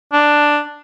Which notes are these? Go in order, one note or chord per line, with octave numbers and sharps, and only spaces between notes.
D4